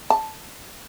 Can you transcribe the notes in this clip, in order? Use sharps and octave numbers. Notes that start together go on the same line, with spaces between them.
A5